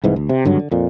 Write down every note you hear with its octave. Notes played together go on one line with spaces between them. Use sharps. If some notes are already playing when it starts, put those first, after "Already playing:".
C2 G#2 E3
D2
C3
G#1 G2 D3 F#3
D3
F2 A#2